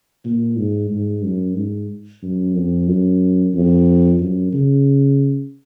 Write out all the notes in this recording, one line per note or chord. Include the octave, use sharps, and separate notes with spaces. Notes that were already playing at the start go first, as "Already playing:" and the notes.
A#2
G#2
G#2
F#2
G#2
F#2
F2
F#2
F2
F#2
C#3